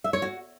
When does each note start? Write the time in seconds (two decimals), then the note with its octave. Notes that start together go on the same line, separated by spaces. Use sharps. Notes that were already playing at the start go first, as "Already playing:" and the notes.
0.04 E5
0.13 C#5
0.22 F#4